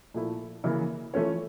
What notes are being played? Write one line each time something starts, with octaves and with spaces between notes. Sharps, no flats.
A#2 F3 A3 E4
C#3 E3 A#3 E4
E3 A3 C#4 F4 C#5